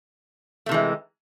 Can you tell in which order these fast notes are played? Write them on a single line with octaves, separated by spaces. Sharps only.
A3 C3 E3 G#3